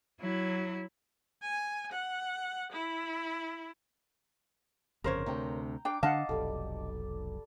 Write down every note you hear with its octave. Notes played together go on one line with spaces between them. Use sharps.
F#3 E4
G#5
F#5
E4
G1 F2 C#3 A#4 C5 C#5
D2 C3 G5 A#5
D4 G5 D6
D3 D4 D#5 F5 F#5 A5
F1 B1 G3 A4